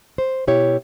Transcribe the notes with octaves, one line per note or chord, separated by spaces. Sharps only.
C5
B2 E4 G4 C#5